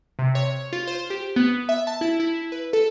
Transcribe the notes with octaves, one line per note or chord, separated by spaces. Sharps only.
C3
C#5
F4
C5
G4
B3
E5
A5
E4
E4
B4
A4